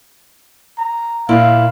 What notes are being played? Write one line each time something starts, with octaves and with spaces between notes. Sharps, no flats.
A#5
A#2 E4 F5